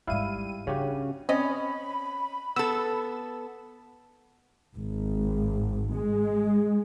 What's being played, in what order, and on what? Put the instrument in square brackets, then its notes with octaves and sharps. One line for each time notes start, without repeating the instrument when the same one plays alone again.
[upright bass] G#1 G#2 [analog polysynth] G3 D#7 [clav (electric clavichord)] E4 F5
[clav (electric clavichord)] C#3 G4 [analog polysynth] C#4 F#4 [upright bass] D4
[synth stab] C4 D#5 [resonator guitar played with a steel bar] C#4 [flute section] B5
[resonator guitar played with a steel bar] B3 A4 [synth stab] E6
[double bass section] G#1
G#3